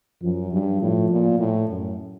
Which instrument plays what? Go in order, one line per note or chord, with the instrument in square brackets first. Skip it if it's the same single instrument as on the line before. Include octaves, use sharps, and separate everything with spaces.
[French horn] F#2 [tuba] F3
[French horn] G2 [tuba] F#3
[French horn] A2 [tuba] F3
[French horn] A#2
A2
F#2